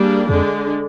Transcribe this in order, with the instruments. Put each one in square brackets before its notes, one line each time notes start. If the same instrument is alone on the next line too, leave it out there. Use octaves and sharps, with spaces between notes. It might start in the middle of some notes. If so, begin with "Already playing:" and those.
Already playing: [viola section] G3 A#3 D4 G#4
[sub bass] F2 [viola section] D3 G#3 D4